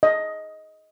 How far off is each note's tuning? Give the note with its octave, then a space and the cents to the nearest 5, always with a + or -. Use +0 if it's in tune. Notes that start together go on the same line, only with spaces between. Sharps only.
D#5 +10